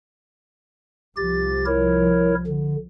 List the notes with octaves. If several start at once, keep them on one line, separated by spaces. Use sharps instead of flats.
C2 F3 G4 A6
E4 A#4 C#5
D3